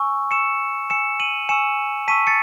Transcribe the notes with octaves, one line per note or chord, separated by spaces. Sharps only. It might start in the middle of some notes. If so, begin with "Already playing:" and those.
Already playing: G#5 C#6 E6
G#5 C#6 E6 C#7 E7
G#5 C#6 E6 C#7 E7
D#7 F#7
G#5 C#6 E6 C#7 E7
A5 C#6 E6 B6 D#7
A6 C#7